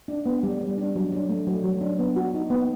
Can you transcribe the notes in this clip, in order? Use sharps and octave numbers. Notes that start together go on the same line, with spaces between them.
D4
B3
G3
G3
D4
F#3
D4
A3
F#3
F#3
D4
B3
F#4
D#4
B3